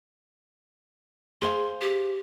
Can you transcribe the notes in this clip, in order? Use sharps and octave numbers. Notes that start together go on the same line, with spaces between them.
G#4 C5 F5 C6
G4